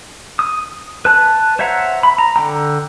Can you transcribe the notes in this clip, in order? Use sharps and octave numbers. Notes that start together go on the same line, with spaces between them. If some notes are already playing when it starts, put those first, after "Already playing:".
D#6
B4 A5 F#6
C5 C#5 E5 F#5 A#5
B5
A#5
D3 G5 A#5